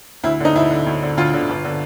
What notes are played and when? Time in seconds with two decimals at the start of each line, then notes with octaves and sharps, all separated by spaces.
0.23 D2 E4
0.40 D3 D#4
0.55 D2 E4
0.70 D3
0.86 D2
1.02 D3
1.17 D2 F4
1.33 D3
1.50 G1
1.64 D3